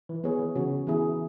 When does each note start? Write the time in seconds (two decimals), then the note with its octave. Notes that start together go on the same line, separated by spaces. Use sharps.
0.09 E3
0.24 E3 B3 G#4 C#5
0.39 E3
0.55 C#3 E3 C#4 F#4 C#5
0.87 E3 B3 E4 G#4